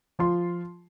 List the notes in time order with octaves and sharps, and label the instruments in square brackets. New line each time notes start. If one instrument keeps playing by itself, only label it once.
[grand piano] F3 F4 C6